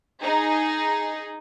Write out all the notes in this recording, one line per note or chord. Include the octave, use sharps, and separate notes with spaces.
D#4 G#4